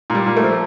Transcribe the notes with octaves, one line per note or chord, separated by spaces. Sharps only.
A#2 G3
A#2
A3
F3